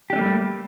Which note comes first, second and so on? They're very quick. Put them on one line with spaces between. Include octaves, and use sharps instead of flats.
G4 D4 A3 A#3 G3